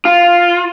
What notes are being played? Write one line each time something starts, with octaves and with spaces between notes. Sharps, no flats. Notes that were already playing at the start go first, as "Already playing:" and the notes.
F4